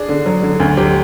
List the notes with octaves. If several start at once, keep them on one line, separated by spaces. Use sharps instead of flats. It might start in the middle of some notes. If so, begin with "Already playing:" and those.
Already playing: D4 G#4
D3
F#3
D3
D2
F#3 G4